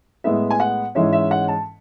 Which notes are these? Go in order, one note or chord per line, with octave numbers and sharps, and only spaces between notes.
A2 G#3 B3 E5
G#5
F#5
G#2 E3 G#3 C#4 E5
E5
F#5
A5